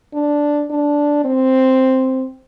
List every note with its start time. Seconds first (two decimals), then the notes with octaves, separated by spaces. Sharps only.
0.14 D4
0.70 D4
1.24 C4